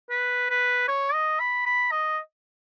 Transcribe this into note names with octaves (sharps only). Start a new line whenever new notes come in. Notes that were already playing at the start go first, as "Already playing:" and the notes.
B4
B4
C#5
D#5
B5
B5
D#5